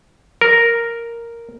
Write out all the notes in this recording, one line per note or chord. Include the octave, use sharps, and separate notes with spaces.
A#4